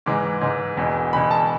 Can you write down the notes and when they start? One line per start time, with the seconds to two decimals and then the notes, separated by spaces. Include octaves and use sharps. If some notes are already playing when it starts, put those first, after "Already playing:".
0.06 G#2 E3 G#3 D6
0.41 G#2 E3 G#3
0.77 E1 E2 B2
1.13 E1 E2 B2 B5
1.31 A5